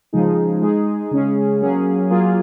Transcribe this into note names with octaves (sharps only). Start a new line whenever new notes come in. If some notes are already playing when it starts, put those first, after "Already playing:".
C#3 F3 G#3 D#4 G#4
G#3 D#4 G#4
C#3 G#3 C#4 G#4
F#3 A#3 C#4 G#4
F#3 A#3 F4 G#4